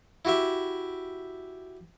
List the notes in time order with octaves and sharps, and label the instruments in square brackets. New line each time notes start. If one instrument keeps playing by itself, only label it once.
[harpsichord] E4 F#4 G4 E5